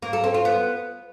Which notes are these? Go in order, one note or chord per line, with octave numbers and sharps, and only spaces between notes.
A#3
A4
C4
F4
B3